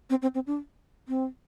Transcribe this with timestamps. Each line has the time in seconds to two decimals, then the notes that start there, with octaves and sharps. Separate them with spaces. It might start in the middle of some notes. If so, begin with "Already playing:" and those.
0.10 C4
0.22 C4
0.35 C4
0.47 D4
1.08 C4